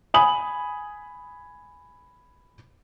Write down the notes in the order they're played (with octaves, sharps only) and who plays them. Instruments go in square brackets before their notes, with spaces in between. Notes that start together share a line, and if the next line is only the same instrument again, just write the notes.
[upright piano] G#5 B5 D#6 F#7